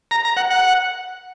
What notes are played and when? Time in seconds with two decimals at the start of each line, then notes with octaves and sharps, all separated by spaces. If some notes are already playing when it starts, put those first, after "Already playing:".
0.11 A#5
0.25 A#5
0.37 F#5
0.50 F#5